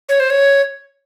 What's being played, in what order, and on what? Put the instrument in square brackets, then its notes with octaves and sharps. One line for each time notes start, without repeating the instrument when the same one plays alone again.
[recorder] C#5
C5
C#5